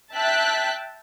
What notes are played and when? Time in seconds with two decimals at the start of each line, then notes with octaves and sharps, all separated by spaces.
0.14 E5 G5 A5 F#6 B6